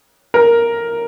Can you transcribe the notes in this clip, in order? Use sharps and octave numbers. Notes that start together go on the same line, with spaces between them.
A#4